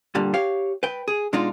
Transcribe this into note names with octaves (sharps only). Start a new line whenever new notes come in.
G2 A#2 D3 G3
G4 C#5 F5
B4 G5
G#4
B2 G#3 D4 D#4 F4